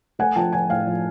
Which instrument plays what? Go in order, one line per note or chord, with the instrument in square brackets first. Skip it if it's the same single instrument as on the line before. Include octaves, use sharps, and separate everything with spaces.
[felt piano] A3 F#5 G#5
F3 G5 A5
F3 F#5 G#5
A2 F5 G5
F3